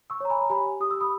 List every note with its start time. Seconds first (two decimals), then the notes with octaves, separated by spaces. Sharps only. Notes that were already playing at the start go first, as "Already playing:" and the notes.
0.10 C#6 E6
0.21 C#5 A#5
0.30 G#5 B5
0.41 A#5
0.50 G4 G#5 B5
0.80 G4 D#6
0.91 E6
1.01 B5 D#6